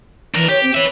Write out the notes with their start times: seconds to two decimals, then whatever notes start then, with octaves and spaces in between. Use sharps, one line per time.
0.34 E3 D4 A#4
0.49 G4 C#5
0.62 C4
0.75 B4 C#5 E5